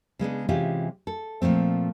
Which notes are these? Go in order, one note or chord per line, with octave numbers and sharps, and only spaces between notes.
C#3 G#3 B3 D4
C3 E3 G#3 C#4 F4 G4
A4
A#2 F3 A3 C4